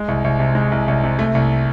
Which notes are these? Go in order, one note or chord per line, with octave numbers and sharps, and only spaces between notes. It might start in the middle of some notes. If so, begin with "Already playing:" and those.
Already playing: G#3
C2
C2
C3
G#3
C2
C2
C3
A3
C2